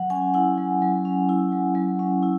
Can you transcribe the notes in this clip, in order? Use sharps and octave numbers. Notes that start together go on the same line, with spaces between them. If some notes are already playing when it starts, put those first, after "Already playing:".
Already playing: F#3 F#5
C#4 G#5
E4 F#5
F#3
F#3
C#4
E4
F#3
F#3
C#4
E4